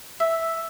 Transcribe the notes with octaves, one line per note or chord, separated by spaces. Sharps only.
E5